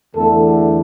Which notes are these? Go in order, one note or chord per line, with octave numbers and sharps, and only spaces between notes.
E2 D3 A3 A4